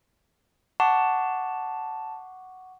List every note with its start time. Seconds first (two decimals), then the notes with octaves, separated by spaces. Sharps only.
0.80 F#5 A5 C#6 D6